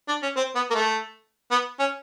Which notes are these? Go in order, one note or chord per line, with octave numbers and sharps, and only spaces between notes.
D4
C#4
C4
B3
A#3
A3
B3
C#4